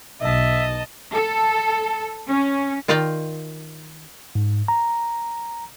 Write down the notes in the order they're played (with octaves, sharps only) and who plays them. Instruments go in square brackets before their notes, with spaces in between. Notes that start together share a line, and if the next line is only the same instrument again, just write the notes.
[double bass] B1 [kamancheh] D#5 A5 [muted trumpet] E5
[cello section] A4
C#4
[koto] D#3 F4 D5 D#5 F5 G5
[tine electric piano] G#2
A#5